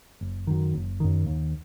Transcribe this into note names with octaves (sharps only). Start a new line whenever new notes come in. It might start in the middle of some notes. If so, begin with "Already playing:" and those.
F#1
F#2 D#3
F#1
F#2 D#3
D#2